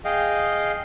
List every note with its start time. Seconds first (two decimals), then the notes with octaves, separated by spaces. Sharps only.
0.05 G#4 D#5 F5 G5